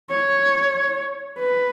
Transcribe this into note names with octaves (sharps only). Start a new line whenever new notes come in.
C#5
B4